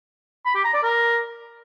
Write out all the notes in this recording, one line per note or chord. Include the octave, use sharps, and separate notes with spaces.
B5
G4
A#5
D5
A#4